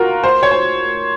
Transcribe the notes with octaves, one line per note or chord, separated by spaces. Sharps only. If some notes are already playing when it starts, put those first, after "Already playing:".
Already playing: F4 F#4 A#4
C5
C#5
C5